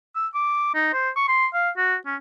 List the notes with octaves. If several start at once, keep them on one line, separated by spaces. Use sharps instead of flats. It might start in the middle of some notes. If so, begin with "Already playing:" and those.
E6
D6
D#4
C5
C#6
C6
F5
F#4
C#4